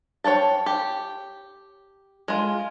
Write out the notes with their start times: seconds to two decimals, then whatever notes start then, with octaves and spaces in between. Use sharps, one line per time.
0.24 C#5 D5 G5 A5
0.66 G4
2.28 G#3 F4